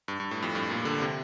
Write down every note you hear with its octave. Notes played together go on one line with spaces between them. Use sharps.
G2
G2
A2
F2
G2
A#2
D3
C3